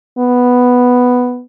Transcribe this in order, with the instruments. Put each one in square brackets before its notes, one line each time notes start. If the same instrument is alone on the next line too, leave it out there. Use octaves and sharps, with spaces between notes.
[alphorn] B3